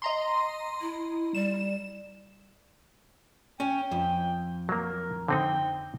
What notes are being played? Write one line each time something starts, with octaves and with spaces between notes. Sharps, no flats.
D#5 A#5 C6
E4
G3 E7
C#4 G5
F2
F#3 A#3 A#4
D3 C4 D#4 G5